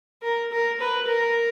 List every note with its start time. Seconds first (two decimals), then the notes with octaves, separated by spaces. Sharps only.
0.23 A#4
0.52 A#4
0.80 B4
1.07 A#4